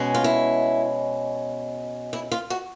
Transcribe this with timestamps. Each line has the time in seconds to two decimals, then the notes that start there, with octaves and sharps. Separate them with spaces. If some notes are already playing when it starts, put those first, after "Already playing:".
Already playing: B2 G#3 C#4
0.15 F4
0.24 E4
2.13 E4
2.32 F4
2.50 F#4